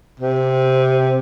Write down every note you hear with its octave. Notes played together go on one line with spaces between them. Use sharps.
C3